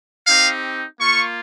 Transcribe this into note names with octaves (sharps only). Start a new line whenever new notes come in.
C4 D#4 G4 F5
A#3 F4 C#6